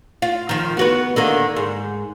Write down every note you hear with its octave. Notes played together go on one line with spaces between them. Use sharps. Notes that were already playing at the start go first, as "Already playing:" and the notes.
F4
D#3 F3
B3 F#4 B4
D3 D#3 A#3
G#2